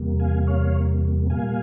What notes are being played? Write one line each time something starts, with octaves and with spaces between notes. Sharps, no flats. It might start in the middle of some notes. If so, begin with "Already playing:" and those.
Already playing: E2 C3 G3 A#3
F5 G#5
C#5 F5
A#2 G3 A#3 F5 G#5